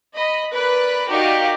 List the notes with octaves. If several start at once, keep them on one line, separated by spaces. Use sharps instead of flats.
D#5 B5
A#4 B4 D5 B5 F#6
D#4 F#4 G4 A#4 D5 F5